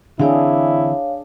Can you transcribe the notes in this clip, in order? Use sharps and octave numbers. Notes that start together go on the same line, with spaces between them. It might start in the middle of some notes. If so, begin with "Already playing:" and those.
D3 E3 C4 D4 E4 G#4 C#5 F5